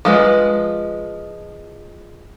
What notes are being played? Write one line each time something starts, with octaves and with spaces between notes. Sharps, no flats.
F3 G#3 B4